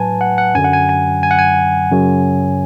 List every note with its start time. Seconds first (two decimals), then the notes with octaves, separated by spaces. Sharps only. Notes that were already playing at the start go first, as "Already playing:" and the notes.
Already playing: A2 F#3 B4 G#5 A5
0.21 F#5
0.38 F#5
0.55 F#2 D3 F#3 G#5
0.64 F#5
0.73 G#5
0.89 G#5
1.23 G#5
1.31 F#5
1.39 G#5
1.91 F#2 C#3 F#3